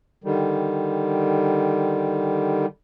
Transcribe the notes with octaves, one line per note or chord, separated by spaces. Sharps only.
D3 D#3 G3